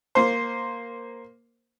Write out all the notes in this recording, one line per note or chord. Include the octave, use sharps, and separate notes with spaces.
A#3 C5